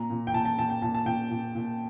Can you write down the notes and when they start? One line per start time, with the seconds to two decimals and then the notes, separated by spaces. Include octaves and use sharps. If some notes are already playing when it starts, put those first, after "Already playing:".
Already playing: A#2 A#5
0.10 A#2
0.27 G5
0.34 A#2 A5
0.45 A5
0.58 A#2 A5
0.70 G5
0.82 A#2 A5
0.95 A5
1.06 A#2 G5
1.31 A#2
1.55 A#2